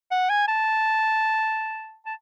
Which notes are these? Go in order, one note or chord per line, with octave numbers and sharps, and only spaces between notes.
F#5
G#5
A5
A5